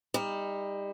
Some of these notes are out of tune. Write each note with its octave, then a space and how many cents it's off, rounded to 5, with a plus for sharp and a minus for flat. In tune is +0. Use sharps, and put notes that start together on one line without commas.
G3 +30 D#4 +15